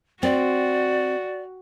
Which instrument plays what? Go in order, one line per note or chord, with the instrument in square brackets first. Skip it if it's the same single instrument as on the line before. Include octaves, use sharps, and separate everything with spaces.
[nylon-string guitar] C4 [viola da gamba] F#4 [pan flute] D5